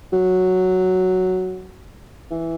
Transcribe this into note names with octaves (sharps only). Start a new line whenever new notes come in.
F#3
E3